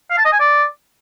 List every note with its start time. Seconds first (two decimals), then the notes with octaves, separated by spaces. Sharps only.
0.10 F5
0.18 A5
0.25 D#5
0.32 G#5
0.40 D5